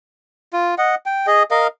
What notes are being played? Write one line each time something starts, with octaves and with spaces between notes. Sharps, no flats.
F4
D#5 F#5
G5
G#4 D#5
A#4 D#5 F5